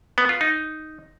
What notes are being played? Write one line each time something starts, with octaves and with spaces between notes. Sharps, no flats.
B3
F4
D#4